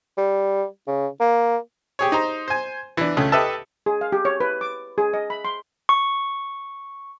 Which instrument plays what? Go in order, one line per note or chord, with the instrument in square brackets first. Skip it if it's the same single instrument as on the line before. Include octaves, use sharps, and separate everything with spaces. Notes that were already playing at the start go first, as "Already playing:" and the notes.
[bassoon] G3
C#3
A#3
[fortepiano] G4 G#4 C#5
D#4 C5 A#5
C5 G#5
E3 D4
C#2 C#3 A3
G4 A4 B4 D#5 E5 A5
[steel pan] G#4
F5
G4
C#5
B4
D6
G#4
D#5
B5
C6
[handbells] C#6